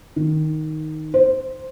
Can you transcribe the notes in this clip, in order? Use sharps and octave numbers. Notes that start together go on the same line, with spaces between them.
D#3
C5